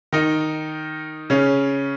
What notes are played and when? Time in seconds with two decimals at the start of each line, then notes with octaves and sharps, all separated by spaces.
0.12 D#3 D#4
1.30 C#3 C#4